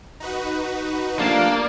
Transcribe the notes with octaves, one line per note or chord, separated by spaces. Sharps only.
D#4 F#4 B4
F3 G3 A3 A#3 D4 F5 A5